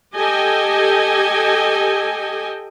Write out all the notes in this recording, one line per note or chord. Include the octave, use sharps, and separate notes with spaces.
G4 A4 D#5 G5 G#5